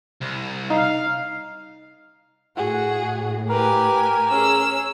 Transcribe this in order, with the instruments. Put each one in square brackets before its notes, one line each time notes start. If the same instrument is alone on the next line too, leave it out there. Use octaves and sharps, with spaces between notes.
[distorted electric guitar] C2
[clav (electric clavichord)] D#4 [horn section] F5
[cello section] A2 [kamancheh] F#4 G#4
[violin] G4 G#5 [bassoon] A#4 [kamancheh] B4
[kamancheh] C#4 G#4 [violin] E6